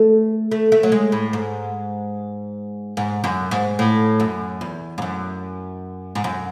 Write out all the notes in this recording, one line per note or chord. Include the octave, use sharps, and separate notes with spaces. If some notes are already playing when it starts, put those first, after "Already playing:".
Already playing: A3
A3
A3
F#3
G#3
A2
G#2
G#2
F#2
G#2
A2
F#2
E2
G#2
F#2
G#2
F#2